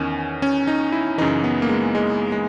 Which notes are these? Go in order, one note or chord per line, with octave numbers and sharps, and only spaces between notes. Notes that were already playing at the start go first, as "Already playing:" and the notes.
Already playing: E2 D#3 C#4
C#4
D#4
E4
F#2 C#3 E3 D#4
B3
A#3
G#3
G#3
G#3